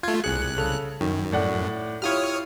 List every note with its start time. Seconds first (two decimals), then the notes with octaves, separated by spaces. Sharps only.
0.03 A3 F4 G#6
0.24 C2 G#4 F#6 C#7
0.58 C#3 A4 F7
1.01 F#2 D#3
1.32 A2 D5 F#5
2.02 E4 F4 G4 C#5 D#6 F6